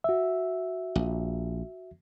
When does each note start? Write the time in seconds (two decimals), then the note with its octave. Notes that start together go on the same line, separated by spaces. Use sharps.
0.04 F#4 E5
0.95 A#1